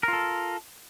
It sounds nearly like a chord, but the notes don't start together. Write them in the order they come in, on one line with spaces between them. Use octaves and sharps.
A#4 F4 A4